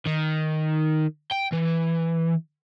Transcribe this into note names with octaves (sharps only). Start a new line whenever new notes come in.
D#3
G5
E3